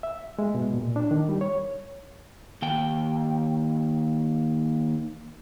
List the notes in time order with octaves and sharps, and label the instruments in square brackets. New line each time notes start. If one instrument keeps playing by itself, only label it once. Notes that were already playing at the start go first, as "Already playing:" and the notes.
[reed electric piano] E5
G#3
B2
A#2
D4
D#3
G3
C#5
[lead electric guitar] D#2 G5